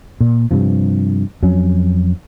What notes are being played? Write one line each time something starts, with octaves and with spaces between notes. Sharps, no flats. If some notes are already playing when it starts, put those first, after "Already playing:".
A#2
G2 C3 F3
F2 F#3 C#4